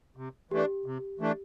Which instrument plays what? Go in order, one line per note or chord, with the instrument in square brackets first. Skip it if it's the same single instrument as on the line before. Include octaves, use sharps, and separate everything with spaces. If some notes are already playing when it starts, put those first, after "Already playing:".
[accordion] C3
[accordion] E3 A3 D4 [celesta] G4
[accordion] C3
E3 A3 D4